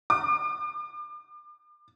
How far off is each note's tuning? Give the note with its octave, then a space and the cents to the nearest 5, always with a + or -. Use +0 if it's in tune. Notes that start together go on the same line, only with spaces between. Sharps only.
D6 +40